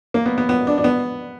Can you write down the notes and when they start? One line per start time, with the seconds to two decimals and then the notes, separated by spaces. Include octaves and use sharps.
0.14 A#3
0.26 B3
0.38 B3
0.49 B3
0.67 D4
0.78 D4
0.84 B3